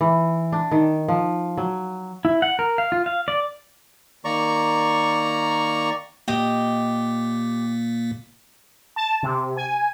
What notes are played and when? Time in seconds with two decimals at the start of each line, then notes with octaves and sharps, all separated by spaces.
0.01 E3
0.52 D4
0.71 D#3
1.08 F3
1.58 F#3
2.25 E4
2.42 F#5
2.59 A#4
2.78 F5
2.92 F4
3.06 F5
3.28 D5
4.25 D#3 A#3 D5 A#5 C#6
6.28 A#2 A#3 G4 D#5
8.96 A5
9.23 C3
9.57 G#5